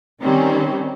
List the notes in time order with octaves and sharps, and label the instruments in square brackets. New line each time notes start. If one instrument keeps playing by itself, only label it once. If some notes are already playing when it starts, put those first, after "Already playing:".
[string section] D#3 G3 C4 C#4